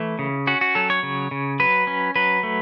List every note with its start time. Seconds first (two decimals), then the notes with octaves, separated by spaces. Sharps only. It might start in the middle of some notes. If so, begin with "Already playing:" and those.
Already playing: E3 A3 E4
0.19 C#3
0.47 C#4 F#4
0.61 F#4
0.75 F#3 A4
0.90 C#5
1.03 C#3
1.31 C#3
1.60 F#3 B4
1.87 C#4
2.16 F#3 B4
2.43 A3